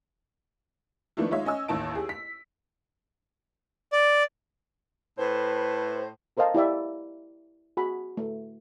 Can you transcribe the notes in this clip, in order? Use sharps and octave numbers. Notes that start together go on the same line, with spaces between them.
D#3 F3 A3 B3 D4 E4
G#3 D#4 F4 C#5 E5
C#4 D#5 G#5 E6
A1 D#2 A5 D7
G4 G#4
B6
D5
A2 B4 C5
A4 A#4 C5 D#5 F5 A5
E4 G4 D5 E5
F#4 G#4 B5
A3